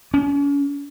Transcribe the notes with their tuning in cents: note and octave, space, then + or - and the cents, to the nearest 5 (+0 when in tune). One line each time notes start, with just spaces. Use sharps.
C#4 +40